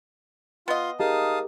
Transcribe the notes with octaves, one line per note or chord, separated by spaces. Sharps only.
B3 F4 D#5 C6
D#4 G4 G#4 A#4 F5 A5 D#6